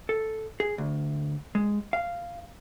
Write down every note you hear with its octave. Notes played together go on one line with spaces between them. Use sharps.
A4
G#4
D2
G#3
F5